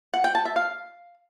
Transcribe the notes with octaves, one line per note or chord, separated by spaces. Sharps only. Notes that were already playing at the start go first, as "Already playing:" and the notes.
F#5
G5
A5
E5
F5